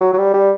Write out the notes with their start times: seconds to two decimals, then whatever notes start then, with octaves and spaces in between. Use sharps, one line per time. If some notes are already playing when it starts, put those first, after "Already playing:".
0.01 F#3
0.14 F#3
0.18 G3
0.34 G3